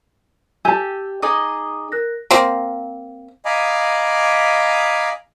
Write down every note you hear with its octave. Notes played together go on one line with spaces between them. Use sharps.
G4 G#5 A5 E6 G6
D#4 G#4 D#5 D6
A#4 F#6 A#6
A#3 C4
D#5 F5 G#5 A#5 B5 D6